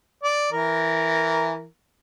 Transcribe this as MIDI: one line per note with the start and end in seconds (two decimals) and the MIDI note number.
0.24 0.50 74
0.52 1.65 52
0.52 1.65 70